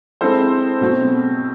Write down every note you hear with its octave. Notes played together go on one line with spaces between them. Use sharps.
G#3 C4 E4 A4 C5
B2 F#3 A3 C4